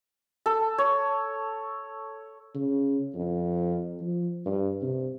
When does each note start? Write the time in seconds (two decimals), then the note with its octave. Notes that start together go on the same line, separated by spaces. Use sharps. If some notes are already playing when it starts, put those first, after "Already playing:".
0.46 A4
0.78 C#5
2.55 C#3
3.15 F2
4.01 F3
4.46 G2
4.82 C3